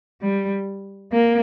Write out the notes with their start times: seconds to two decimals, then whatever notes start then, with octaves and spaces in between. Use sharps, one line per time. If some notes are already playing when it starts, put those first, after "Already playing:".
0.22 G3
1.12 A#3